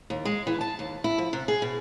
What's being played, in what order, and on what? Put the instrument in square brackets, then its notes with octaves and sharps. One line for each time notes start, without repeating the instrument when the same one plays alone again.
[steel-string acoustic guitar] D#2
G#3
E3
A5
D#2
E4
F3
C3
G#4
B2